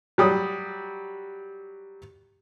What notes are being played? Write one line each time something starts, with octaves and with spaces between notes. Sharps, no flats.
F#3 G3 D#6